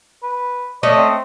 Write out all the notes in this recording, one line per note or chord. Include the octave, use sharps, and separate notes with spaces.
B4
A3 C#4 D5 D#5
C4